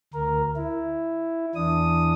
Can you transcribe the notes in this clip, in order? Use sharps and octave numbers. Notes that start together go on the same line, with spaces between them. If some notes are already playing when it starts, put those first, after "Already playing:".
D2 A#4
E4
E2 E3 D4 D#6